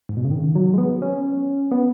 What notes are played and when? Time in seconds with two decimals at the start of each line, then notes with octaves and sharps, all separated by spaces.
0.09 G#2
0.17 B2
0.25 C#3
0.31 D#3
0.55 F#3
0.74 G#3
0.78 B3
1.02 C#4
1.71 B3